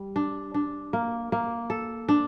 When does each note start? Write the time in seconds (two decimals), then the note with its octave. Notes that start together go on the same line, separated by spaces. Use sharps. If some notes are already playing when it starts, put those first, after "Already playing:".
Already playing: G3
0.16 D4
0.54 D4
0.93 A#3
1.32 A#3
1.70 A4
2.09 D4